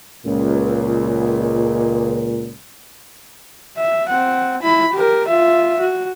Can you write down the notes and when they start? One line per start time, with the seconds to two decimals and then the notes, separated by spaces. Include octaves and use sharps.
0.25 C#2 A#2
3.78 E5
4.09 C4 F#5
4.63 E4 B5
4.94 G4 A#4
5.28 F4 E5
5.80 F#4